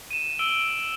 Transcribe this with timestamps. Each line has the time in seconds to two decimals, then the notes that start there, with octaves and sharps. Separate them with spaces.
0.11 D#7 E7
0.39 E6 D7 F#7 G7